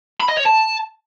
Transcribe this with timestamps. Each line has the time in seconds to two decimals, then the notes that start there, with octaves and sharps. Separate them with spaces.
0.21 B5
0.29 D#5
0.38 C#5
0.46 A5